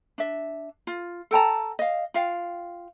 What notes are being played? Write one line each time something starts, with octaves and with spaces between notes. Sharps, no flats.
D4 E5
F4
A4 G5 A5 A#5
D#5 F5
F4 F5 G5